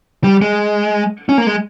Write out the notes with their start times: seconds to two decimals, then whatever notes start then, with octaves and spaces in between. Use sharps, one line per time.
0.24 G3
0.42 G#3
1.29 C#4
1.38 A#3
1.47 G#3